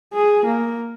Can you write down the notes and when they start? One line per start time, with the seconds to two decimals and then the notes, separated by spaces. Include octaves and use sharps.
0.14 G#4
0.45 A#3